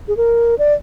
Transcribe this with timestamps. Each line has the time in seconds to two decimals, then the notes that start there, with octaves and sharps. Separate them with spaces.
0.08 G#4
0.17 A#4
0.59 D5